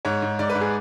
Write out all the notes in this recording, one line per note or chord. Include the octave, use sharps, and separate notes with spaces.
G#2 C#5
G#2
G#2 D5
B4
G#2
G#4